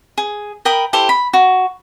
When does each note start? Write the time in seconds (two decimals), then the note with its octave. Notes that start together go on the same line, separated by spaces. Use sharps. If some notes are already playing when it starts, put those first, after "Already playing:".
0.18 G#4
0.65 A#4 G5 B5 D#6
0.93 E4 G4 A4 C5
1.09 B5
1.33 F#4